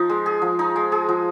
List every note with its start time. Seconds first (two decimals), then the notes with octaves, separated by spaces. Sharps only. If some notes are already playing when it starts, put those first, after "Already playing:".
Already playing: F3 D#4
0.10 G#3
0.26 G#4
0.42 F3
0.59 D#4
0.76 G#3
0.92 G#4
1.09 F3